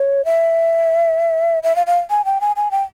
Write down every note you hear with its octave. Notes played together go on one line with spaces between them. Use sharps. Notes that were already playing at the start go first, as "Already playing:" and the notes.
Already playing: C#5
E5
E5
F5
F5
G#5
G5
G#5
G#5
G5